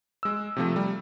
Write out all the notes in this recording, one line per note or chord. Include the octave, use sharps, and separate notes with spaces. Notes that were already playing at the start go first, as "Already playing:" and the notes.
G#3 E6
C3 F3 A3
G3